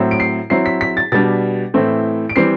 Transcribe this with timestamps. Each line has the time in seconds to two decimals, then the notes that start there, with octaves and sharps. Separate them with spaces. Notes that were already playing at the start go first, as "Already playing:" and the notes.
Already playing: A2 F#3 C4 E4
0.11 D7
0.20 C7
0.50 F#3 C4 E4 C7
0.66 B6
0.81 B6
0.97 A6
1.12 B2 G3 D4 A6
1.74 A2 E3 A3 C4 E4
2.29 D7
2.36 E3 G3 C4 C7